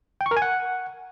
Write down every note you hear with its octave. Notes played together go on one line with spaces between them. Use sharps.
G5
C#6
A#4
G#5
F#5